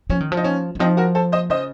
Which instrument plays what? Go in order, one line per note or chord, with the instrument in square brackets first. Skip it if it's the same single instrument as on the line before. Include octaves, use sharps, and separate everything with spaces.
[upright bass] F3 [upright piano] C#4
[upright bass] D#3
F3
[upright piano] D#4
C#4
[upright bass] D#3
[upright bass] F3 [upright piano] C4 D#4
[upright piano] F#4 A#4
A4 C5
C5 D#5
[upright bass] C#3 [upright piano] C5 D#5